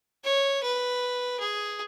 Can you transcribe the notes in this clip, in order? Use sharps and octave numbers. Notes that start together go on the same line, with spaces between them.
C#5
B4
G#4